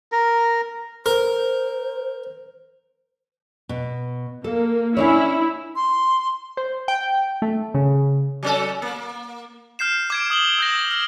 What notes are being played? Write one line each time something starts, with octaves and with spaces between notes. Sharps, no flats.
A#4
A#4 C5
B2
A#3 A4
C#4 D4 E4 C#5
C6
C5
G5
A3
C#3
F#3 C#4 A4
A#3
F6 G6 C7 E7
D6 G#6 D7
D#6 F#7 G7
E6 G6 A#6
F6